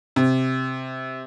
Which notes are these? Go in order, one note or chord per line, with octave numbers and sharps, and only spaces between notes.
C3